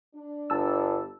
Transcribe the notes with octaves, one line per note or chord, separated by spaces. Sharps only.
D4
G1 A5 E6